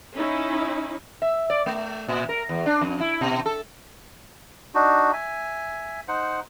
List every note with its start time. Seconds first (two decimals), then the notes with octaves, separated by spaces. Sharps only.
0.16 C#4 D#4 E4
1.22 E5
1.50 D5
1.66 A3
2.08 A#2
2.29 A#4
2.49 E2
2.66 D4
2.81 F2
3.00 E4
3.21 B2
3.46 A4
4.75 D4 D#4 F#4
5.13 E5 G#5
6.08 D#4 C5 F#5